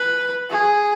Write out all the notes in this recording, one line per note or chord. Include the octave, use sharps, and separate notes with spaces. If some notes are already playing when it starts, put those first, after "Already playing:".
Already playing: B4
G#4